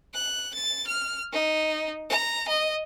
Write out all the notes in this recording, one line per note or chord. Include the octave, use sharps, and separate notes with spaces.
F#6
A6
F6
D#4
A#5
D#5